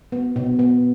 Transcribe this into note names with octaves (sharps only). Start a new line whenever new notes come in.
B3
B2
B3